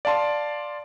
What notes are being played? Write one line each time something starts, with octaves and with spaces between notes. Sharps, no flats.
D5 F5 A5 C6